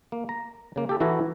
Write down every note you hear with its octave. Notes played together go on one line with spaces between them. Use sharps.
A#3
A#5
C#3 A#3
G4 A4
E3 E4 F#4 A4 A#5